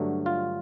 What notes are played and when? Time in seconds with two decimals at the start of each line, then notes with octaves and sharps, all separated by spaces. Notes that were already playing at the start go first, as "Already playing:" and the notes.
Already playing: G2 D3 F#3 A3
0.26 F4